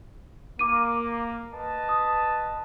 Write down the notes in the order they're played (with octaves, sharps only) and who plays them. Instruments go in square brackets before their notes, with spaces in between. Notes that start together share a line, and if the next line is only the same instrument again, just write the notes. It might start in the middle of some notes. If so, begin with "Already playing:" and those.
[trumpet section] A#3 [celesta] D6 D#7
[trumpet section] B4 D#5 A5
[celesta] D#6